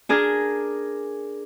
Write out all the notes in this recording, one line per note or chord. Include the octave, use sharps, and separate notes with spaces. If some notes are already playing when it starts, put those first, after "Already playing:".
D4 G#4 A#4